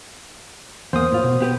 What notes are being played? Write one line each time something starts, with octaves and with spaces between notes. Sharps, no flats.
E2 A#3 C5 D#6
A2 F4
B2
B3 G4 B4